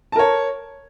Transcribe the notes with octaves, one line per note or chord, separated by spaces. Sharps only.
A#4 C#5 A5